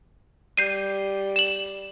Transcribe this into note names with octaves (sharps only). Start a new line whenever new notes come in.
G3 G6 C7 D#7
E7 F#7